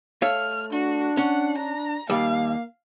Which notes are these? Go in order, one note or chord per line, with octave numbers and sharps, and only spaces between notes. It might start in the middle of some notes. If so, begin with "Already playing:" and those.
A3 C#5 F5 F6
D4 F#4
C#4 F#5
D4 A#5
D#2 G3 A#3 F5